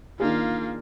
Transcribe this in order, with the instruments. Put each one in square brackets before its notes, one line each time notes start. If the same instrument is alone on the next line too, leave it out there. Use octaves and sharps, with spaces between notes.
[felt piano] D#3 D4 G#4 [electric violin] A#3 F4